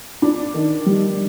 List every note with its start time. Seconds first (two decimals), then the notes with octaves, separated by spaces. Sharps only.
0.22 D4
0.54 D#3
0.86 G3